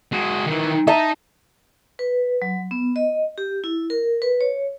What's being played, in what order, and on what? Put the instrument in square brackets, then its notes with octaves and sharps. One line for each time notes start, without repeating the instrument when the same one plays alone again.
[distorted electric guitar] G#3 F#4
D#3 E3
[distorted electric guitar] D#4 [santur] E5 A5 A#5
[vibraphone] B4
F#3
B3
D#5
G4
E4
A#4
B4
C#5